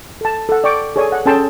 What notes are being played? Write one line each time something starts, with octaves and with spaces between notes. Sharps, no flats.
A4 A5
A4 F#5
D5 G5 C#6 D6
G#4 A4 C#5 D5 G#5
F#5
C#4 G#4 A4 G5 A5 C6